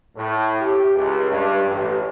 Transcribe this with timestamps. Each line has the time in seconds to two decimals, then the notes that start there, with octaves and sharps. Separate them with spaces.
0.15 A2
0.60 G4
0.95 C#2
1.31 G2
1.68 A1